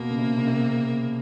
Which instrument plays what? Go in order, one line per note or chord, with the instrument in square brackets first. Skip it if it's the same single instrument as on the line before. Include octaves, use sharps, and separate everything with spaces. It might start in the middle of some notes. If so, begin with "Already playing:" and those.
Already playing: [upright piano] B2 [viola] A#3
[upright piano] C#3
C3
C#3
C3